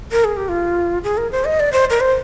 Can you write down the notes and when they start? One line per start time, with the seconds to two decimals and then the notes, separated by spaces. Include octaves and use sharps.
0.12 A#4
0.24 G#4
0.37 G4
0.49 F4
1.04 G#4
1.17 A#4
1.32 C5
1.45 D#5
1.60 D5
1.72 C5
1.90 A#4
2.00 C5